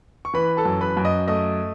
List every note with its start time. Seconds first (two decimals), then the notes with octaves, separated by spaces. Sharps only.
0.25 C#6
0.34 E3 B4 B5
0.57 A4 A5
0.65 F#2
0.81 B4 B5
0.97 F#2
1.05 D#5 D#6
1.28 A3 D#5 D#6